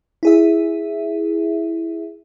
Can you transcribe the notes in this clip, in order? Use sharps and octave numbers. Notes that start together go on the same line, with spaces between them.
E4 G#4 E5